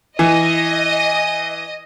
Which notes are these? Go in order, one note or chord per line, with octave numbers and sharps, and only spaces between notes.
E3 D#5